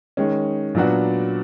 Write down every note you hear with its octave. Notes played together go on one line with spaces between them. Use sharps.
D#3 G#3 C#4
A#2 F#3 B3 D4 F#4